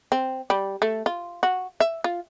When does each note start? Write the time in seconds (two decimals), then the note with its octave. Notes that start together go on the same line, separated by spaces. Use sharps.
0.12 C4
0.50 G3
0.82 A3
1.06 F4
1.43 F#4
1.80 E5
2.04 F4